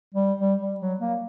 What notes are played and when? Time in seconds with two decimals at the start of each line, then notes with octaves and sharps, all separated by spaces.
0.14 G3
0.40 G3
0.61 G3
0.80 F#3
1.00 A#3